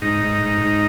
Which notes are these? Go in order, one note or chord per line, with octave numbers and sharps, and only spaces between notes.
G#2 D#4
G#2
G#2
G#2